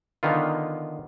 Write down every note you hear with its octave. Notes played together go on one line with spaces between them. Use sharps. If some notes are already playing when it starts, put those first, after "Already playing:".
D3 D#3 B3 F4